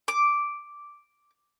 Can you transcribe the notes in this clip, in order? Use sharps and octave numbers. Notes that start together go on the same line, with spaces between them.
D6